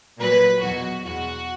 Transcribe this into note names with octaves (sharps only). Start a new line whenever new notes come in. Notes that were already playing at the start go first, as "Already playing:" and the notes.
A#2 F#3 B4
E2 B2 F#3 F#4
E2 B2 G#3 F#4